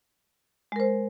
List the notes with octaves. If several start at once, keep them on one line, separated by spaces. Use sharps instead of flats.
G#3 A#4 C5